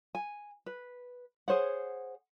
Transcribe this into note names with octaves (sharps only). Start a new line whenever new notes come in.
G#5
B4
G#4 C5 C#5 F#5